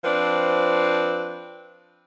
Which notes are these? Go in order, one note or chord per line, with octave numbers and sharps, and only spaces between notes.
F3 C4 D4 B4